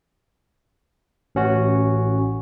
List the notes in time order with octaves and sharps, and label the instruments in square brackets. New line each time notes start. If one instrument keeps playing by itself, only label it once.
[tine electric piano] A1 C#4 F#4